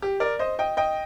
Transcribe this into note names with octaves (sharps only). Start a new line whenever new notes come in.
G4
A#4 D5
C5 D#5
D#5 G5
D#5 G5